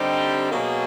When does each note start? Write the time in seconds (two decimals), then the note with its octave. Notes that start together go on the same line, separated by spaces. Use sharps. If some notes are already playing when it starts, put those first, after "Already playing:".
Already playing: D3 G3 C4 D#4 G4
0.50 B2 F#3 A#3 D#4 G#4